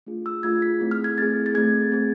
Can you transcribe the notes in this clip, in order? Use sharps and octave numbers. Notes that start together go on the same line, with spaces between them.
A3 D4 F4 G#4
E6
A3 D4 F4 G#4 G#6
B6
A3 C4 E4 G#4
F6
G#6
A3 C4 E4 G#4 A6
A6
A3 C4 G#4 G#6
A3 C4 G#4